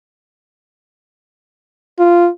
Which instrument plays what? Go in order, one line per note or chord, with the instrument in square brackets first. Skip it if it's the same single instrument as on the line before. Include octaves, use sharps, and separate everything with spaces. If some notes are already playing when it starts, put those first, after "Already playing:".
[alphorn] F4